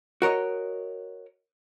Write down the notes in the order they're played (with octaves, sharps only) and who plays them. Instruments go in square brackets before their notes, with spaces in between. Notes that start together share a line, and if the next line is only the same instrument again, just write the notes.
[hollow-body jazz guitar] F#4 A#4 C#5 D#5